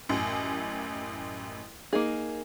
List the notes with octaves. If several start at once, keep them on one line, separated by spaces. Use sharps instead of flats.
A1 F#2
A#3 D#4 G#4